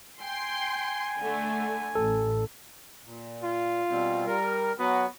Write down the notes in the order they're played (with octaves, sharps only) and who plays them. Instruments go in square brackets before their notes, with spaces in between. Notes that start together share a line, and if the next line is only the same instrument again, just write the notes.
[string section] G5 C6 [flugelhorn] G#5
[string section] D3 A3
[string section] A1 [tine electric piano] A4
[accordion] A#2
[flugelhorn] F4
[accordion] B2 G3 C4
G3 A#4
[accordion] F#3 F#4 [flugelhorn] B3